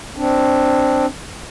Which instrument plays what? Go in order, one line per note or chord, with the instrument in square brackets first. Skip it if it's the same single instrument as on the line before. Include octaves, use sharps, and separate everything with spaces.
[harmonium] C4 D4